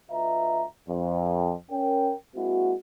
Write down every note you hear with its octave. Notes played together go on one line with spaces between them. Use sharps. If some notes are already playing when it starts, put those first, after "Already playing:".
D2 F4 B4 D#5 E5 A#5
F2
C#4 A#4 G5
G#3 A#3 C4 E4 F#4